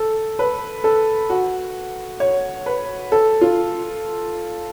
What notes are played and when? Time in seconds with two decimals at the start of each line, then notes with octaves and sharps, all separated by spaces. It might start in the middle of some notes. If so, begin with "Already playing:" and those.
Already playing: A4
0.39 B4
0.84 A4
1.30 F#4
2.20 C#5
2.66 B4
3.12 A4
3.41 F4